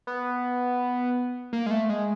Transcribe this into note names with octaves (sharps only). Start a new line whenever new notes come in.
B3
A#3
G#3
A3
G#3